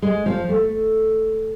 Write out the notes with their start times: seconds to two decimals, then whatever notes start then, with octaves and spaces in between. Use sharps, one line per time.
0.02 G#3
0.26 F3
0.49 A3